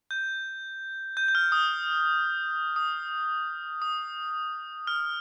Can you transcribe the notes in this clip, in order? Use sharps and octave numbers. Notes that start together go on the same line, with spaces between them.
G6
G6
G6
F6
D#6
D#6
D#6
F6